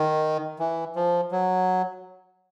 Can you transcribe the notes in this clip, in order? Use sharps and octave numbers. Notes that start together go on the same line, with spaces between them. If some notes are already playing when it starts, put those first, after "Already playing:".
Already playing: D#3
E3
F3
F#3